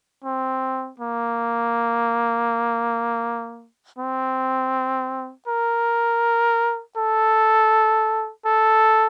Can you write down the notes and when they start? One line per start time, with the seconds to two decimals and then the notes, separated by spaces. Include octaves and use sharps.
0.25 C4
1.00 A#3
3.99 C4
5.48 A#4
6.97 A4
8.46 A4